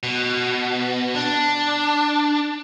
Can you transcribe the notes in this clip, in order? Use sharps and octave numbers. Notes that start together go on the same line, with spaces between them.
B2
D4